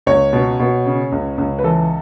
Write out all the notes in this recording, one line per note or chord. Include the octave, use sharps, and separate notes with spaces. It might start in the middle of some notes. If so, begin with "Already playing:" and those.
C#2 C#5
B2
B2
C#3
C#2
C#2
B4
E3 A4